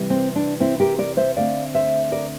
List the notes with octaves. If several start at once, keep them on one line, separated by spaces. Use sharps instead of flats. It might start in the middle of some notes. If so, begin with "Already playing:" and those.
Already playing: C3 E3 G3
C4
D4
C4 E4
G4 A#4
A#4 D5
C5 E5
D2 D3 A3 C4 D5 F5
C5 E5
A#4 D5